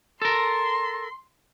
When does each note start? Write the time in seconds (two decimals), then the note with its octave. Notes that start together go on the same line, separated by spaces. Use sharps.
0.22 A4 A#4 C6